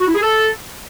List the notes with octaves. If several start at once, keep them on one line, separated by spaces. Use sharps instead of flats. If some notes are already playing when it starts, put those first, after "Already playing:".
F#4
E4
G#4
A4